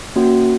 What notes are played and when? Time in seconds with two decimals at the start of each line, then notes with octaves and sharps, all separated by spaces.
0.16 A#3 C#4 F#4